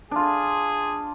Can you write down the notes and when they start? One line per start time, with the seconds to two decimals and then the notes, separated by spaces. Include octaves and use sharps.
0.11 D4 F4 G#4